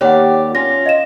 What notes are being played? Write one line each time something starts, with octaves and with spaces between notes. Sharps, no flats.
D#2 G4 C#5 D5 F#5
C#4 F4 A#6
D#5 F5 E7